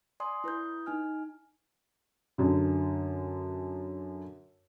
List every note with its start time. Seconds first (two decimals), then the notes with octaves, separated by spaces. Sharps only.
0.20 D5 G#5 C6 D#6
0.44 E4 B4 D#6 G6
0.86 D#4 G#5 F6
2.38 F#2 D3